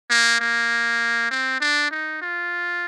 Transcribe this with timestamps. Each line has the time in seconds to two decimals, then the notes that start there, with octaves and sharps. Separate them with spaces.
0.10 A#3
0.40 A#3
1.31 C4
1.60 D4
1.91 D#4
2.22 F4